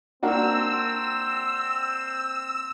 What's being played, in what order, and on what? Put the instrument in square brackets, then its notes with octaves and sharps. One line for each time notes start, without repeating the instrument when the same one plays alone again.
[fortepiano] A#3 D4 F#4 [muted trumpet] C4 [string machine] E6